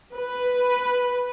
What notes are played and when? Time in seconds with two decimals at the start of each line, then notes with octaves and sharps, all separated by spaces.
0.16 B4